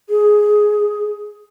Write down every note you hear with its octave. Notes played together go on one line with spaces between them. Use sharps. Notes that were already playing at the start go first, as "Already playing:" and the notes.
G#4